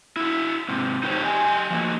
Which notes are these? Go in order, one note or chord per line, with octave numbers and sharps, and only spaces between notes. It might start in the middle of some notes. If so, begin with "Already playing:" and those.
E4 F#4
G#2 C3
D#4 F#4 G4 A#4 C5 C#5
G4 D#5 G#5
F3 A#3 F#4